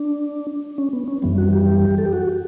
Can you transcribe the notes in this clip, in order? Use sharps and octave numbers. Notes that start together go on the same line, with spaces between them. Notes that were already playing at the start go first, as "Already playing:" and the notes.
Already playing: D4
C#4
B3
C#4
F#2 E3 G3 B3
F#4
G4
A4
G4
F#4